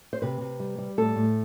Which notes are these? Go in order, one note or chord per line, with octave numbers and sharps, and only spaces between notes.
C5
C3 B4
C3
G3
G3
A2 A4
A2